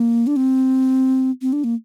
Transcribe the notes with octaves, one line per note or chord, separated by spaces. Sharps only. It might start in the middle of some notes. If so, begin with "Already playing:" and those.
Already playing: A#3
D4
C4
C4
D4
A#3